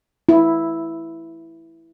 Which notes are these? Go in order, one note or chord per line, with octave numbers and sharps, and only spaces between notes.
E4